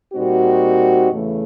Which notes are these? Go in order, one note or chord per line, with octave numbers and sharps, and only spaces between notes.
A#2 G3 C4 D#4 F#4
E2 C#3 E3 A3